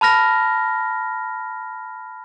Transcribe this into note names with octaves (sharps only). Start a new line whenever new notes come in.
A5 B5 F6 A#6